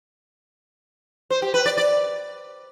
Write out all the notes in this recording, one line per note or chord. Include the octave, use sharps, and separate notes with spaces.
C5
G4
B4
D5
D5